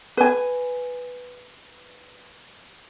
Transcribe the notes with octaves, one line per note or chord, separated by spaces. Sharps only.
B4 G#5